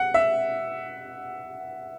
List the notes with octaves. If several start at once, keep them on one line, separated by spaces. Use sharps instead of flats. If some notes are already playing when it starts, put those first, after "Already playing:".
Already playing: F#5
E5